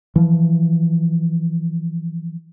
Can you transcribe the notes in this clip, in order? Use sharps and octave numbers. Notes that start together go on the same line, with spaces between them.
E3 F3